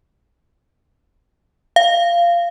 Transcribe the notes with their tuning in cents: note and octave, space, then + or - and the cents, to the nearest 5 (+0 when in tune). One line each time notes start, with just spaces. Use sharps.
F5 -15